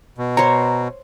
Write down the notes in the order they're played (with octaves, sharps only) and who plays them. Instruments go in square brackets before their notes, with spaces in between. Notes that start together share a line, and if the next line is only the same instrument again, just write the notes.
[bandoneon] B2
[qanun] C5 C#5 [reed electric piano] A#5